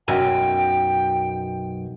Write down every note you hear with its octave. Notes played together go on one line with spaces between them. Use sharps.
B1 F#2 G5 G#5